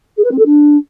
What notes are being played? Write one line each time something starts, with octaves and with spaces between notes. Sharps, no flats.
G#4
B4
C4
A4
D4